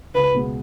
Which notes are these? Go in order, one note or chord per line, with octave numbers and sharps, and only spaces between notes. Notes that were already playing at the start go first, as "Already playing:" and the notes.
C#2 B4
B2 G#3 B3